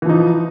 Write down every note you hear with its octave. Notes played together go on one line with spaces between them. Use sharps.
E3 F3 D#4